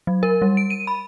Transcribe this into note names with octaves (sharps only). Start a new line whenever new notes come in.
F#3
A#4
G3
D7
D#7
B5